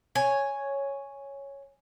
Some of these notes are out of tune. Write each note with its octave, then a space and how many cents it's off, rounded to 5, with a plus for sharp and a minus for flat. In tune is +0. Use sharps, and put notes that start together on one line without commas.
C#5 +0 G#5 +0